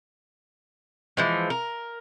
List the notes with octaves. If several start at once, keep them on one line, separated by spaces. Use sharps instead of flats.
E3 F3 G#3
A#4